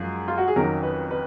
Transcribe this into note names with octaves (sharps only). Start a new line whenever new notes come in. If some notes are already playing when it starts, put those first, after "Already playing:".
Already playing: F#2 F3 G#3 G#4
F4
F#4
G#4
F2 D#3 F#3 C#4 A#4
B4
B4